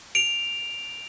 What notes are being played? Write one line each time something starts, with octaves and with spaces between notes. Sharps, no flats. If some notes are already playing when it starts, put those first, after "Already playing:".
D7 F7